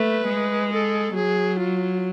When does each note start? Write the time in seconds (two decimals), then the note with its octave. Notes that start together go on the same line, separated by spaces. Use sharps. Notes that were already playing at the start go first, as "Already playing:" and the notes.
Already playing: A3 B4
0.29 G#3
0.73 A4
1.16 F#3 G#4
1.59 F4